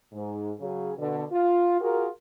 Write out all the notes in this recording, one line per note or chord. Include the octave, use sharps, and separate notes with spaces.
G#2
C#3 F#3 G#4
B2 D3
F4
F4 F#4 G#4 A#4